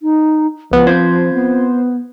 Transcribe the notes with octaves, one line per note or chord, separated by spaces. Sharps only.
D#4
C#2 F3 B3
C4 F4 C5 G#6
B3